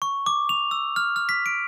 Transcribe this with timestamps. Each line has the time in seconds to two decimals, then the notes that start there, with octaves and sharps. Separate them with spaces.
0.02 C#6
0.26 D6
0.49 F7
0.71 E6
0.96 F6
1.16 F6
1.29 B6
1.46 D7